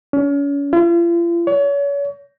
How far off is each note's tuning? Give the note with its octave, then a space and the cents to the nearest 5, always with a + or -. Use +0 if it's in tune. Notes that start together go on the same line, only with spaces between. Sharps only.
C#4 +35
F4 -40
C#5 +35